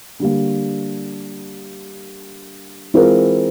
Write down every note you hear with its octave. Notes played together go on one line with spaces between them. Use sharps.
D3 G3 A#3
E3 G#3 C4 F4 A#4